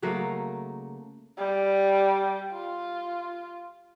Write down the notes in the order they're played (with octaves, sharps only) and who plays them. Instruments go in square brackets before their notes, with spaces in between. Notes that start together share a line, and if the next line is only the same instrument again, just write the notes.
[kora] C#3 F#3 A3 A#3
[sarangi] G3
F4